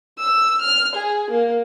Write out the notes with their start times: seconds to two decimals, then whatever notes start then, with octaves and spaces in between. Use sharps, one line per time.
0.20 E6
0.62 F6
0.96 G#4
1.30 A#3